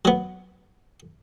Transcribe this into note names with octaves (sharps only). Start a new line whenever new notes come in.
F#3 B3